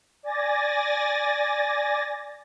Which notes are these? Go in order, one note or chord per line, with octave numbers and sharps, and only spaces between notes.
D5 G#5 A6 A#6